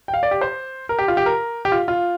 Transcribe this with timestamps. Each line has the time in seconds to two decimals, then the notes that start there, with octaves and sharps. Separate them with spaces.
0.08 G5
0.14 F5
0.23 D5
0.31 G4
0.41 C5
0.89 A#4
0.99 G4
1.08 F4
1.17 G4
1.26 A#4
1.65 G4
1.72 F4
1.88 F4